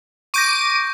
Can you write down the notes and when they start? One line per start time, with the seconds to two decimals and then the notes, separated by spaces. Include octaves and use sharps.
0.34 C#6 D6 G6 A#6 D#7